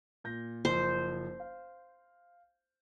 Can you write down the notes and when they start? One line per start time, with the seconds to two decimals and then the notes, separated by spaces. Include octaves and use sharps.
0.24 A#2 G6 A#6
0.65 F#1 F3 C5
1.40 F5